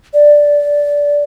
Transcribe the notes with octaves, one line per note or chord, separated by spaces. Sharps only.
D5